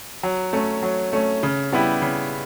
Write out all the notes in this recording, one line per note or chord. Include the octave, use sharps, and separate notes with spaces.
F#3
A3 C#4
F#3
A3 C#4
C#3
G3 B3 E4 G4
C#3